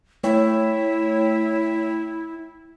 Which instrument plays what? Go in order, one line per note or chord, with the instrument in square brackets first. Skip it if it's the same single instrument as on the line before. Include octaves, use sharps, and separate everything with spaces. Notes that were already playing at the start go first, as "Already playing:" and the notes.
[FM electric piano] A3 C#5 G5 [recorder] E4